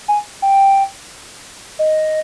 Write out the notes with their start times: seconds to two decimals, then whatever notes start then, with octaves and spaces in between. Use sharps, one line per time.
0.08 G#5
0.42 G5
1.79 D#5